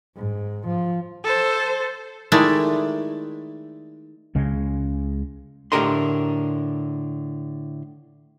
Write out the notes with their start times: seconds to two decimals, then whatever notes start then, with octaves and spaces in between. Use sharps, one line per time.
0.16 G#2
0.68 F3
1.24 A4 C5
2.32 D#3 G#3 A3 E4 D5
4.35 C#2 C#3 G#3
5.72 A2 D3 G4 A#4 D#5 C6